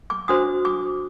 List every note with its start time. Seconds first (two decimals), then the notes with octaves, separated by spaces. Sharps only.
0.10 D6
0.28 D4 F#4 C5 D#6
0.65 D6